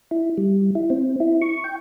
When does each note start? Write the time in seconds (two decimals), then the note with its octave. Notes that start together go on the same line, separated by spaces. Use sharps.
0.11 E4
0.38 G3
0.75 E4
0.90 C4
1.20 E4
1.42 C#6
1.64 G5